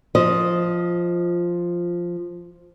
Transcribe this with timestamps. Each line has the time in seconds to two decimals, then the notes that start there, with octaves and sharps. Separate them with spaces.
0.15 F3 D#5